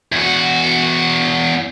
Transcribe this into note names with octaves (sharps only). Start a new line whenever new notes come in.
E2 F#4